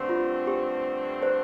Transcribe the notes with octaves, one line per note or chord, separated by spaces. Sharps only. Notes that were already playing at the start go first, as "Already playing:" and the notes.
Already playing: G2 D3 A3 C4
F4
G4
C5